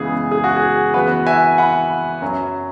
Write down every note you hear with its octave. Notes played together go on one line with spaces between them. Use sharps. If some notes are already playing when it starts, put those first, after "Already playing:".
Already playing: F#2 C#3 E3 G#3 B3 G#4
G#4
F#4
G#4
E2 E3 B3 F#4 B4
E5 G#5
F#5 B5
F#2 F#3 C#4